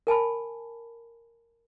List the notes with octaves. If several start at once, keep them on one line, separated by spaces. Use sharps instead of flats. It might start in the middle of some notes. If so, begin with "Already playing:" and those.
A#4 G#5 A5 B5